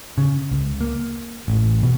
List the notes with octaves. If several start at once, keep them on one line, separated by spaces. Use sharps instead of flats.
C#3
C#2
A#3
A1
B2